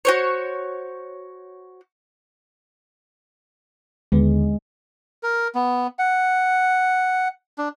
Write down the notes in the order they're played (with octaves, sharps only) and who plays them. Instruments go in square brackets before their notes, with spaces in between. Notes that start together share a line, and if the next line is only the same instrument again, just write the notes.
[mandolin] F#4 C5 C#5
[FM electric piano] D#2 D3 B3 [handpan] G#3
[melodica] A#4
B3
F#5
D4